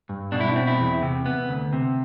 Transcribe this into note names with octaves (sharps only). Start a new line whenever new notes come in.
G2
B2 D4
E4
D4
C4
E4
E2
C3
B3
D2
C3